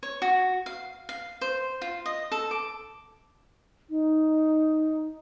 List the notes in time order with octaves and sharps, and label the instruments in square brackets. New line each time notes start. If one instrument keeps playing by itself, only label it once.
[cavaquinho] C#5
F#4
F5
F5
C5
F4
D#5
A4
D6
[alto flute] D#4